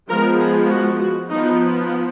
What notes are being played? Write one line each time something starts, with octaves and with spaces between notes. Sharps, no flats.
F3 G#3 B3 A#4
G#4
F#4
F#4
F3 B3 D#4